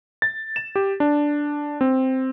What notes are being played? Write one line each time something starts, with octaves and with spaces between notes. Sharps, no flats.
A6
E7
G4
D4
C4